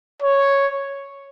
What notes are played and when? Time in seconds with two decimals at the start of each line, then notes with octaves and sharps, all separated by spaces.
0.22 C#5